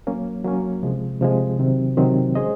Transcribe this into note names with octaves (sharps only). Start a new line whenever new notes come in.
F#3 A#3 C#4
F#3 A#3 C#4
C3 F3 G#3
C3 F3 G#3
C3 D#3 F#3 C4
C3 D#3 F#3 C4
G#3 C#4 G#4 C5 D#5